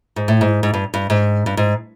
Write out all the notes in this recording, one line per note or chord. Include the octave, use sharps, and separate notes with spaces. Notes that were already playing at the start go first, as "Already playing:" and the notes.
G#2
A2
G#2
G#2
G2
G2
G#2
G2
G#2